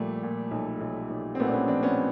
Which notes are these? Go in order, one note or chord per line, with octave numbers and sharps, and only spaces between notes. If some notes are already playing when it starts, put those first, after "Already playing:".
Already playing: A#2 F3 G3 A3
A#2
B1
B1
B1
C4
A#2 A3 B3
D4
B3 C#4
F3 C4 D4
B3 C#4